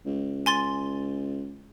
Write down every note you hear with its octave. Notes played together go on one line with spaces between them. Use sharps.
C#2
G#5 C6 A6